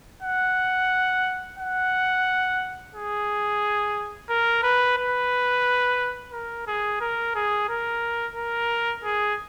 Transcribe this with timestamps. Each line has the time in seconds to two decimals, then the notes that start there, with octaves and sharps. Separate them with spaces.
0.22 F#5
1.58 F#5
2.94 G#4
4.29 A#4
4.63 B4
4.97 B4
6.32 A#4
6.67 G#4
7.00 A#4
7.35 G#4
7.69 A#4
8.35 A#4
9.04 G#4